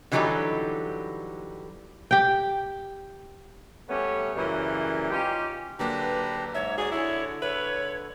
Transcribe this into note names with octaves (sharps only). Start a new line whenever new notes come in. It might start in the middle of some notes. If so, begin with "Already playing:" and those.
D3 E3 F#3 G3 D#4 G4
G4 G5
G3 A3 B3 C#4 C#5
F#2 C#3 E3 G3 A#3
C#4 D#4 F4 G4
D3 F#3 A#3 D4 G4 B4 A#5
G#2 C#5 E5
F#4 G#4 D5 G#5
D3 E4 C#5
B4 C#5 E5